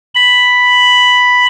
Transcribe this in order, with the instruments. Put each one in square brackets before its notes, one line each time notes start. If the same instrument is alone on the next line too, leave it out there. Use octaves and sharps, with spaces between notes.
[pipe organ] B5